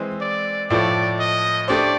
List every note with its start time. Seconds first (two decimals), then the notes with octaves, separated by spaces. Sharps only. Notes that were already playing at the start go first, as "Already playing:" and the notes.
Already playing: E3 G#3 C4
0.21 D5
0.70 A2 F3 A3 D5
1.19 D#5
1.68 A3 D4 G4 C5 D5